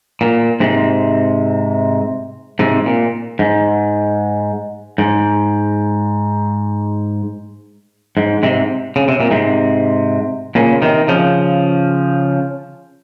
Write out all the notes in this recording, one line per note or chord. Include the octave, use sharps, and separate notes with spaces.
A#2
G#2 C3
G#2 C3
A#2
G#2
G#2
G#2
G#2 C3
C#3
C3
A#2
G#2 C3
A#2 C#3
C3 D#3
C#3 F3